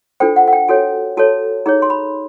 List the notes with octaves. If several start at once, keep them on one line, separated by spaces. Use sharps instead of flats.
D4 F4 A4 C5 G5
F#5
F#5
G5
F#4 A4 C#5 G#5
F#4 A4 C#5 A5
D#4 G#4 C#5 A#5
C6
B5